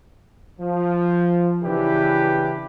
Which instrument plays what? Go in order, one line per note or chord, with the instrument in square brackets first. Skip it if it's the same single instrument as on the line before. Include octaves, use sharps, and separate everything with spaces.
[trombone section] F3
C#3 E3 D4 E4 G4 B4